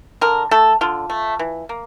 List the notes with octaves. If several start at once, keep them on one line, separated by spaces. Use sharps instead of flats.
D3 A#4
A3 A4
D3 F4
A3
E3
A#3